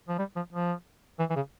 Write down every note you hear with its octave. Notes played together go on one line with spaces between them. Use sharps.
F3
G3
F3
F3
E3
E3
C#3